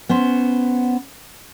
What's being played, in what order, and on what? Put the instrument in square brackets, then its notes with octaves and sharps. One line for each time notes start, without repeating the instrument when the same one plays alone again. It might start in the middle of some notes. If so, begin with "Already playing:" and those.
[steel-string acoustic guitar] B3 C#4 C5